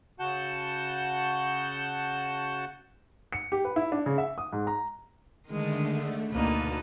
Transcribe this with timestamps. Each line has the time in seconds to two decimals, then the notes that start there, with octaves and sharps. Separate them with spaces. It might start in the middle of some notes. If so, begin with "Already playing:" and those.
0.19 C#3 F#4 F#5 A5 G6
3.33 C#7
3.52 G4
3.65 B4
3.76 E4
3.92 D4
4.06 C#3
4.18 E5
4.38 D#6
4.53 G#2
4.67 A#5
5.48 D3 D#3 G#3 A3
6.32 D2 B2 A#3 D#4 B4 A5